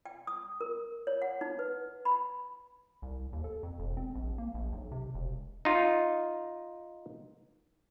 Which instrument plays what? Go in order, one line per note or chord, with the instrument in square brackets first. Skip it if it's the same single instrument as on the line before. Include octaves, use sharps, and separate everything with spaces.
[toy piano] G5
D#6
A#4
C#5
F#5
D#4
B4
B5
[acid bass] C2
D#2
A4
F2
E1
C4
A#1
A#3
A#1
B1
C3
E1
[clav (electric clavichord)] D#4 F4